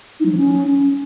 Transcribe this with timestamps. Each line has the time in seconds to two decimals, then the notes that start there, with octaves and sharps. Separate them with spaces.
0.20 D#4
0.26 F#3
0.32 F3
0.38 C#4